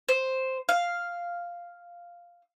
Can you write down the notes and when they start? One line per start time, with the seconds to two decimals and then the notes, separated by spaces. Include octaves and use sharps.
0.09 C5
0.69 F5